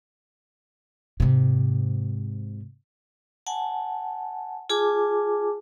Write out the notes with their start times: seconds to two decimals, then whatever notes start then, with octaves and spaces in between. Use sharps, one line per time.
1.20 G#2 C3
3.46 F#5 G#5 A5
4.69 F4 G#4 G#5 A5 D6